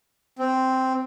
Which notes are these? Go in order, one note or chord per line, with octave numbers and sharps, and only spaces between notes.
C4